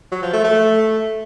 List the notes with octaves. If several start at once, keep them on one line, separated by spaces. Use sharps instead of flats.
F#3
F3
A3
A3